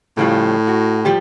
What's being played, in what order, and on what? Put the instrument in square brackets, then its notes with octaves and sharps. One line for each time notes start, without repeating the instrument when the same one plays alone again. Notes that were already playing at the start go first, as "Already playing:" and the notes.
[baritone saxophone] A2 [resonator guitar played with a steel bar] C#3 F3 G3
[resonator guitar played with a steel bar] F#4
F3 G3 G4